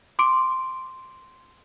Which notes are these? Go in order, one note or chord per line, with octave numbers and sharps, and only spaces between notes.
C6 D6 D7